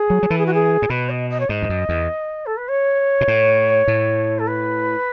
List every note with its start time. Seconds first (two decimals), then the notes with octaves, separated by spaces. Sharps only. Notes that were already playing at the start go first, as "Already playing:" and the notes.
Already playing: G#4
0.10 F#3
0.23 F#3
0.30 E3 A4
0.38 G#4
0.46 F#4
0.54 G#4
0.82 A2
0.90 B2 B4
1.10 D#5
1.30 D#5
1.40 C#5
1.49 G#2 D#5
1.62 E2
1.69 F#2
1.89 E2
2.46 A4
2.57 B4
2.68 C#5
3.21 B2
3.28 A2
3.88 A2
4.39 A4
4.47 B4